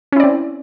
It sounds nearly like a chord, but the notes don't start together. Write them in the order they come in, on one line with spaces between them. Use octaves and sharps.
C#4 E4 D5 C4